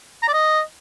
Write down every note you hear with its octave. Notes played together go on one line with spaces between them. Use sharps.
A#5
D5
D#5